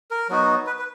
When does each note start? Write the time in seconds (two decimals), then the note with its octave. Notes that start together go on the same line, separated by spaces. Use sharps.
0.11 A#4
0.29 F#3 B3 D#4 F#4
0.66 B4
0.79 B4